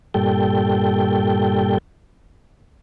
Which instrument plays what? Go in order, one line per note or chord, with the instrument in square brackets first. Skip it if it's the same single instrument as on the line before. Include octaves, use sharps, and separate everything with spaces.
[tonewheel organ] G2 A#2 G3 A4 G5